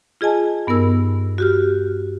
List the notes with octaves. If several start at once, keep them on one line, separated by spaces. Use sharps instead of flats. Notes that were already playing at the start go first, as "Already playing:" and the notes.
F4 G#4 D#5 G#5 A5
G2 B3 D#4 A#4 E6
F#4 G4 F6